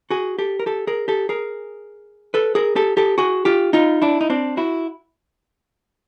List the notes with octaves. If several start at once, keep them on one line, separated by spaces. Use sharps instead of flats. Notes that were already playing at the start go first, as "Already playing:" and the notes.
F#4 G#4
G4 A4
A#4
G4 A4
G#4 A#4
G4 A4
G#4 A#4
A4 B4
G#4 A#4
G4 A4
G4 A4
F#4 G#4
F4 G4
D#4 F4
D4 E4
D#4
C4 D4
E4 F#4